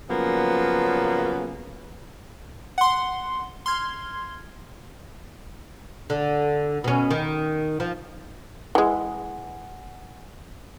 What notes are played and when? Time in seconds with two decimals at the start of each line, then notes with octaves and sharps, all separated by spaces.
0.09 C#3 F3 F#3 A#3 B3
2.78 F#5 C6
3.66 C6 F6 G#6
6.10 D3
6.84 B2 C#4
7.11 D#3
7.80 F3
8.75 E3 G#3 F#5 G#5